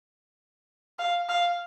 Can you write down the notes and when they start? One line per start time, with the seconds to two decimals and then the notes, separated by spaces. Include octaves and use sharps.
0.99 F5
1.29 F5